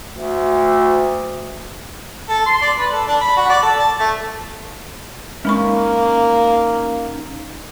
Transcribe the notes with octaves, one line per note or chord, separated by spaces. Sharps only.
D2
A4
C6
D5
B4
A4
D4
B5
F#4
D5
A4
A5
A3
G#3 A#3 C#4 D#4 B5 C#6